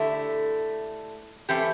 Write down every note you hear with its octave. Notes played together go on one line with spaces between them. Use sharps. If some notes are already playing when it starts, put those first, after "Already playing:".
Already playing: D3 A3 E4 G4
E3 A3 C4 G4